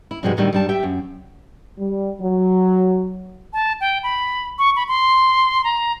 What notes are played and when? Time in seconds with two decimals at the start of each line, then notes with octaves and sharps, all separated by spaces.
0.11 E4
0.23 G2 C3 F3 G#3 F#4
0.37 A2 D3 D#3 G3 A3
0.53 G2 G3 A5
0.69 G4 E5 G5
0.83 F#2
1.78 G3
2.21 F#3
3.53 A5
3.81 G5
4.03 B5
4.59 C#6
4.76 B5
4.88 C6
5.64 A#5